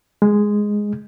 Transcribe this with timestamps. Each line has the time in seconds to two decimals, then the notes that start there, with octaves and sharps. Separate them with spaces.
0.22 G#3